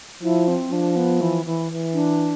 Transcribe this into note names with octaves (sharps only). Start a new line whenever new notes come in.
F3 E4
C4
F3 D4
B3
E3
E3
E3
D4